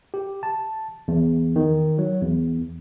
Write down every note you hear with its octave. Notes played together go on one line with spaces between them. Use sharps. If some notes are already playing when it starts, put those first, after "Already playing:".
G4
A5
E2
D#3
F#3
E2